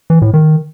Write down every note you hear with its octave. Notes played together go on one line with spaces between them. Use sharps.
E3
A2
D#3